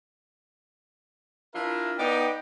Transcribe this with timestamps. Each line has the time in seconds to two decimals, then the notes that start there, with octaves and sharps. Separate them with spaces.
1.55 D4 E4 F4 A#4 E5
1.98 B3 D#4 D5 G5